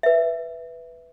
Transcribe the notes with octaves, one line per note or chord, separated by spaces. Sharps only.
B4 E5